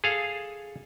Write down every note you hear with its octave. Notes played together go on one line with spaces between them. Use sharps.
G#4 A4 F5